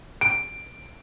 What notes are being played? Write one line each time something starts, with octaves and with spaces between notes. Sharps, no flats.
D7